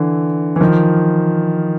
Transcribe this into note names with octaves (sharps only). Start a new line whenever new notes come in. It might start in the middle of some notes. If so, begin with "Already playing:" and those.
Already playing: D3 E3
E3
D#3 F3